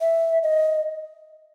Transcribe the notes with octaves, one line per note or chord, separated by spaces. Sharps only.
E5
D#5